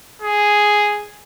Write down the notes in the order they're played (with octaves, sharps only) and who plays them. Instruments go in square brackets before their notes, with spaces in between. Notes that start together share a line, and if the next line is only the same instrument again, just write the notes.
[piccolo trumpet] G#4